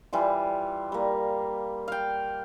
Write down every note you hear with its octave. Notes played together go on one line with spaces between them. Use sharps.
E3 G3 F4
G3 A#3
F5 G5